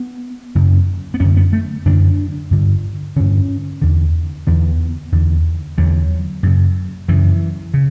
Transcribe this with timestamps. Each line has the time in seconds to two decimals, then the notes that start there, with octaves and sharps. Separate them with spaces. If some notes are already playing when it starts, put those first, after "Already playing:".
Already playing: B3
0.55 F#2 C#3
1.14 B3
1.20 F#2 D3 C#4
1.37 B3
1.53 A3
1.85 F#2 D3 D4
2.51 G2 D3
3.16 G2 D3 C#4
3.82 E2 D3
4.47 E2 D3 B3
5.12 E2 D3
5.78 E2 D3 F#3
6.43 F#2 C#3
7.08 F#2 C#3 E3
7.74 C#3